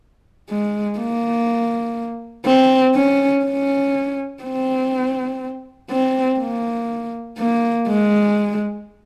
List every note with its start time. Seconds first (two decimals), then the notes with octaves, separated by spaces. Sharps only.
0.50 G#3
0.99 A#3
2.46 C4
2.95 C#4
3.45 C#4
4.43 C4
5.90 C4
6.40 A#3
7.38 A#3
7.88 G#3